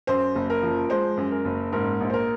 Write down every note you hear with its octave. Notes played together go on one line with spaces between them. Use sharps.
F#2 C5
F#1
A#4
F3
G#3 C5
F#2
A#4
F#1
G#2 A#4
A#1
C5
A#4